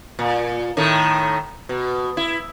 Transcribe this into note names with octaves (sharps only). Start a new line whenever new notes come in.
A#2
A2 D#3 A3
B2
E4